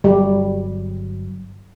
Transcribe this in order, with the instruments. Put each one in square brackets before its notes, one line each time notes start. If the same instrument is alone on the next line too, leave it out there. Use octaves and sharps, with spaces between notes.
[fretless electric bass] G1 F#3 [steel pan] G3